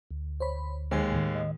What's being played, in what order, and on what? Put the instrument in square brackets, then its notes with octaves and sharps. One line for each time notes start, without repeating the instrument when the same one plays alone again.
[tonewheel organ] D2
[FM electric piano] C5 C#5 B5
[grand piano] D#2 G#3 [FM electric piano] C5 G5 G#5
[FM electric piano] A2 D#3
[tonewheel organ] D#5